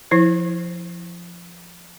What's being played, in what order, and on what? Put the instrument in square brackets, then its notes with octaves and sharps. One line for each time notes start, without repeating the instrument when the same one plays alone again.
[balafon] F3 E4 C5